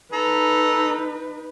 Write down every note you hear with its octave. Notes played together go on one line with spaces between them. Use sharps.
D#4 A4 B4 A#5